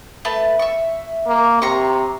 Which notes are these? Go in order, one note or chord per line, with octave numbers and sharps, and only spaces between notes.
A3 B4 A5
E5 C#6
A#3
C3 A#5 C6 C#6